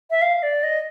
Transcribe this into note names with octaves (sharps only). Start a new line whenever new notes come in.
E5
F5
D5
D#5